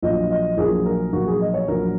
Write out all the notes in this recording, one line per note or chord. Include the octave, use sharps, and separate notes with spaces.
A#1 A#2 F#3 A#3 D#5
D#5
A#1 A#2 F#3 A#3 G#4
A#4
A#1 A#2 F#3 A#3 F#4
G#4
D#5
C#5
A#1 A#2 F#3 A#3 A#4